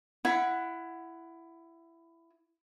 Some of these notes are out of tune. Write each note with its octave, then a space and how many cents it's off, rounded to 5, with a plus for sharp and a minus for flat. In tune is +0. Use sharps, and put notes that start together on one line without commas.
E4 +15 F#5 +0 B5 -15